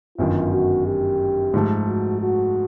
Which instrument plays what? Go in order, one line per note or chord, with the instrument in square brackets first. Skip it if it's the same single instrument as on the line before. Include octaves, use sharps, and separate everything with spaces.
[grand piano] G1 F#2 D#3 [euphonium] F4
[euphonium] F#4
G4
[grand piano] G#2 F3 A3
[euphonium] F#4
F#4